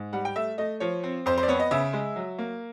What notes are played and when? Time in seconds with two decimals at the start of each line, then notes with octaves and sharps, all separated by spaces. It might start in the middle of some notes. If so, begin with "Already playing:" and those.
Already playing: G#2
0.13 G3 F#5
0.25 G5
0.36 A3 E5
0.58 A3 D#5
0.80 F3 C#5
1.04 C4
1.26 F2 C5
1.37 C5
1.43 D5
1.48 B3 C#5
1.60 D#5
1.71 C#3 E5
1.93 G#3
2.16 F#3
2.38 A#3